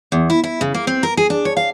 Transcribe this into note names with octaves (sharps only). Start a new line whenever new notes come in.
E2
E4
E4
C#3
A#3
C4
A#4
G#4
D4
C#5
F5